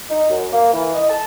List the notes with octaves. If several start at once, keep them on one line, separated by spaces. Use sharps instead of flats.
D#4
F#2
A#3
E3
D#5
A5